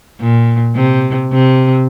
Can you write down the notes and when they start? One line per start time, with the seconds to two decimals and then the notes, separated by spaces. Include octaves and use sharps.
0.20 A#2
0.75 C3
1.32 C3